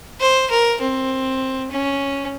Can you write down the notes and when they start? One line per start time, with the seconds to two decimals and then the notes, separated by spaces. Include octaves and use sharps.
0.20 C5
0.50 A#4
0.81 C4
1.71 C#4